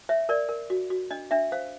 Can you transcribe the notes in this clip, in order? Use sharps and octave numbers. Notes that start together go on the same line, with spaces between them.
C#5 E5
A#4 D5
A#4
F#4
F#4
D4 D#5
D4 E5
C5 F5